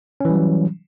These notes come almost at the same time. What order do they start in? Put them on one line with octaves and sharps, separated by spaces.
C#4 E3 G3 F#3